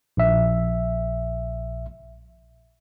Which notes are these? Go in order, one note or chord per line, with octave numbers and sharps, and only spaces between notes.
A#1 E5